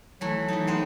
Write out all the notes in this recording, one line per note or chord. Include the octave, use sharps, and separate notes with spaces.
E3 F#3 A3
E3 G3 D#4
G#3 B3 C5